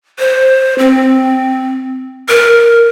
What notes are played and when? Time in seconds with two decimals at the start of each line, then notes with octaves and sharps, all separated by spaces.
0.19 C5
0.79 C4
2.29 A#4